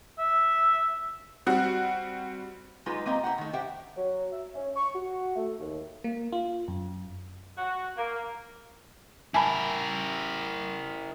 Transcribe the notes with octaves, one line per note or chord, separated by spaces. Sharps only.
E5
G3 C4 F#4 F#5
F#3 G#3 D#4 F4 G4 B4
A#3 C4 G4 D#5 A#5
E4 G4 C5 F#5
D#3 A3
G4 C5 E5 F#5 G5
F#3
E5
C#4
C#6
F#4
A3
D#2
A#3
F4
F#2
F#4
A#3
E4 A#4 G#5 A5 B5